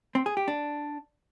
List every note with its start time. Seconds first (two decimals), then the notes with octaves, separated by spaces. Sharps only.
0.15 C4
0.26 G#4
0.37 G4
0.48 D4